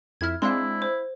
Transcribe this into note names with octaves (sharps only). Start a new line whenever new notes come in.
F2 E4 F6 G#6
G#3 C4 D4 E4 F5 C6
C5